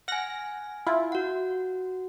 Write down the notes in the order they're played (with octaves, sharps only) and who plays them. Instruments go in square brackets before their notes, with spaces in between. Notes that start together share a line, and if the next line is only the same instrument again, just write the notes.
[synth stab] F#5 A#6 [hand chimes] G#5 F6
[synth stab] E4 F4
[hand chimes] F#4 F#5